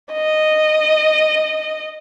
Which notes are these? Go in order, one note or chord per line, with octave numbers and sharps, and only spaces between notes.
D#5